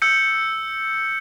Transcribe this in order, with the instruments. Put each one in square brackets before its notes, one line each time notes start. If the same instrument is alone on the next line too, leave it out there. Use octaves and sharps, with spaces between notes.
[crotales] E6 G6 C#7